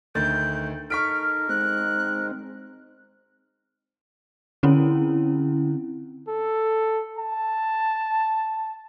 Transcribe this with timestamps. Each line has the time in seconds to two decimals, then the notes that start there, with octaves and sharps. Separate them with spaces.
0.15 D2 D#3 G6 A6
0.90 D#4 A4 A#4 C#6 F6 B6 D7
1.49 G#3 C4 D#4 F#6
4.63 D3 C4 C#4 E4
6.28 A4
7.18 A5